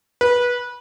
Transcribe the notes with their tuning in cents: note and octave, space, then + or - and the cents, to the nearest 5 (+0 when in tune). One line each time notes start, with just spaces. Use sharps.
B4 -20